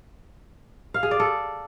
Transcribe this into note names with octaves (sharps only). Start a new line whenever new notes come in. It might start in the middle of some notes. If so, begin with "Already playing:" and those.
F5
G#4
D5
A4